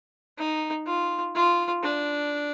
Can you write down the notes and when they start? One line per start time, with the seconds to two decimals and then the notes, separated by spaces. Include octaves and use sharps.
0.38 D#4
0.86 F4
1.35 F4
1.83 D4